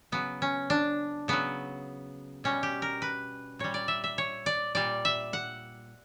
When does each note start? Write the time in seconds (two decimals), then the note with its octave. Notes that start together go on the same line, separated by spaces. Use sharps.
0.12 C#3 F#3 B3
0.42 C#4
0.70 D4
1.28 C#3 F#3 B3
2.44 B2 G3 C#4
2.63 G4
2.82 A#4
3.02 B4
3.59 A#2 G3 C#5
3.74 D5
3.88 E5
4.04 E5
4.18 C#5
4.46 D5
4.75 A#2 G3 D5
5.05 E5
5.33 F#5